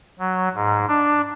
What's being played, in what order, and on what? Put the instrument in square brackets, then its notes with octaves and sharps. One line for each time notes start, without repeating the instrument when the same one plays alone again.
[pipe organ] F#3
G#2
D4